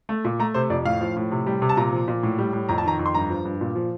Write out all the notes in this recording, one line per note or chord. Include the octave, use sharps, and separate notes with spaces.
A3
A#2
A3 A#5
C3 C5
F2 D5
A2 F5
F3
A2
C3
G3
C3
A5
A#2 A#5
F3
A#2
A2
G3
A2
F2 A#5
A5
D#3 A#5
F2
C6
G2 A#5
F3
G2
A#2
F3